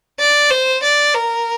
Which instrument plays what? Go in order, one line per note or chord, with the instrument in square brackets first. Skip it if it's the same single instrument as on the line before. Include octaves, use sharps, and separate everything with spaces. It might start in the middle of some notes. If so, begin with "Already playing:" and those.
[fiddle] D5
C5
D5
A#4